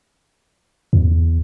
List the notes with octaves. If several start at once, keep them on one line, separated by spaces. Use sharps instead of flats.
E2